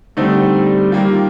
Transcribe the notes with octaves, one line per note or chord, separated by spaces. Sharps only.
D3 G3 A3 C4 D#4
D#3 G3 A#3 F4